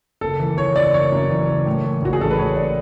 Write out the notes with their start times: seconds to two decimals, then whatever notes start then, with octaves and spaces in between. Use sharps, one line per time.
0.21 F#1 A4
0.40 E3
0.57 E3 C#5
0.76 F#1 D5
0.94 F#1 C#5
1.12 F#2
1.30 E3
1.49 F#1
1.66 A2
1.84 E3
2.02 A1 F#4
2.13 G#4
2.21 A1 A4
2.31 B4
2.38 A2 C#5
2.57 D5